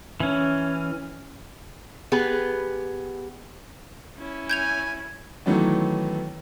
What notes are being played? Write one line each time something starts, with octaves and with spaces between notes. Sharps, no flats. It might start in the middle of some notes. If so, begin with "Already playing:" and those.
E3 C#4
B3 G4 G#4 B4
C#4 E4
G#5 G6 G#6 F7
D#3 E3 F#3 A3 B3 C#4